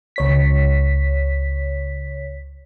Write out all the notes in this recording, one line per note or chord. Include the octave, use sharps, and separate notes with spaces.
C#2 C#5 B6